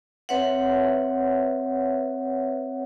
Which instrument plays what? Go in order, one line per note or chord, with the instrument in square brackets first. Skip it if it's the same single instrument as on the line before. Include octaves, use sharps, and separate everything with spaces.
[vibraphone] C4 B4 C#5 E5 F#5